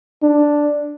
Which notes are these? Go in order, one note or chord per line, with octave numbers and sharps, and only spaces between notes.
D4